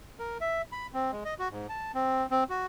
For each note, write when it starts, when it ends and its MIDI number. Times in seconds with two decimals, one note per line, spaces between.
0.19 0.38 70
0.41 0.62 76
0.72 0.87 83
0.93 1.11 60
1.12 1.24 56
1.25 1.34 75
1.39 1.49 66
1.51 1.67 44
1.69 1.92 81
1.95 2.26 60
2.31 2.44 60
2.50 2.66 66